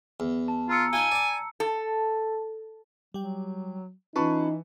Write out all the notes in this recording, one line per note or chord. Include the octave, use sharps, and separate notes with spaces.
E2
A5
F4 A#5 E6 C#7
D#4 F4 G#5
D5 D6
A4
F#3 G3 G5
E3 C#4 D#4 F4 B4 A5 C#6